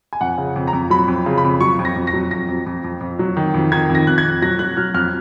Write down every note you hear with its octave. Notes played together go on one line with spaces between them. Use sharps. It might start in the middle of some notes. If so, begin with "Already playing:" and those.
G#5
F2 F#5
C#3
F2
A#5
F2
F#3 B5
F2
C#3
B5
F2
F#3 C#6
F2
A#6
F2
A#6
F#3
F2 A#6
F2
F2
F2
F2
F#3
D#3
F2
D#3 G#6
F2
A#6
F2 F#6
G#6
F2
F#3 A#6
F#3 F#6
F#3 F6
F2 F6